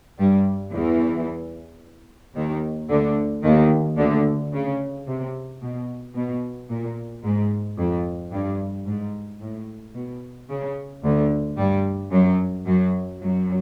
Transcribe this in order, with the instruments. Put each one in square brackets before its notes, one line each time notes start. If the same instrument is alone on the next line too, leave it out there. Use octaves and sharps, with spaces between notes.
[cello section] G2 G3
E2 E3
D#2 D#3
D2 D3
D#2 D#3
D2 D3
C#3
C3
B2
B2
A#2
G#2
F2
G2
G#2
A2
B2
C#3
D2 D3
G2 G3
F#2 F#3
F#2 F#3
F#2 F#3